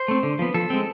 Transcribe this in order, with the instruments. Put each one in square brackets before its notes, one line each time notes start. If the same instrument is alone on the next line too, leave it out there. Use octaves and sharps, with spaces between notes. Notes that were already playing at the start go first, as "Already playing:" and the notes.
Already playing: [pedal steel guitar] C5
A3 C4
D3
F3 B3
F3 A4
G#3 C4